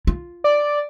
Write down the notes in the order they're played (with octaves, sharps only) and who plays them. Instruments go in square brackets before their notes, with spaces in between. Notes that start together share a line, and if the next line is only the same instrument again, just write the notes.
[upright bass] F4
[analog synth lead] D5